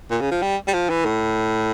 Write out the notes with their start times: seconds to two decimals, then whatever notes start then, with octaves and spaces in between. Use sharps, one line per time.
0.11 A#2
0.21 C#3
0.31 F3
0.42 G3
0.68 G3
0.74 F3
0.90 E3
1.05 A2